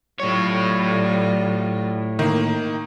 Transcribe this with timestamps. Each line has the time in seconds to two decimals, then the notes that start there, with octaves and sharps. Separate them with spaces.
0.20 A2 F#3 G3 F4 C#5
2.19 D#3 A#3